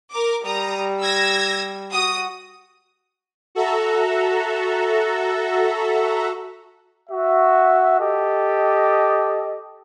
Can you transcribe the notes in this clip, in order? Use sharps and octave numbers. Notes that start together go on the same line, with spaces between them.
A#4 D6
G3 A#5 D#6
E6 G#6 A#6
F#4 D#6
F#4 A4 E5 A#5
F#4 E5
G4 A4 D#5